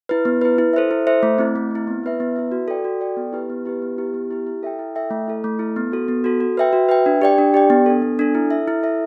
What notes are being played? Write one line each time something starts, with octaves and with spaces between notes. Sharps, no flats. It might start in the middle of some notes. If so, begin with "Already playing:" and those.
E4 B4
B3
E4 B4
E4
A4 C5 E5
E4
A4 C5 E5
A3
C4 E4
A3
C4 E4
B3
E4 B4 E5
B3
E4 B4 E5
F#4
A4 D5 G5
F#4
A4 D5 G5
B3
E4 G4 B4
B3
E4 G4 B4
B3
E4 G4
B3
E4 G4
E4
A4 E5 G5
E4
A4 E5 G5
A3
E4 A4
A3
E4 A4
B3
F#4 A4
B3
F#4 A4
F#4
B4 E5 G5
F#4
B4 E5 G5
D4
G4 D5 G5
D4
G4 D5 G5
B3
D4 A4
B3
D4 A4
E4
A4 E5
E4
A4 E5